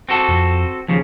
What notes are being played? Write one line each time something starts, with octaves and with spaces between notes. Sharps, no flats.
C4 F#4 A4
F2
D#2 C#3 F3